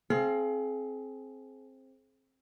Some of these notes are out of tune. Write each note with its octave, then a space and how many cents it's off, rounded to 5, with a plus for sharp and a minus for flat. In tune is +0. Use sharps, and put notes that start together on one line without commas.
C4 +15 G#4 +35 F5 -25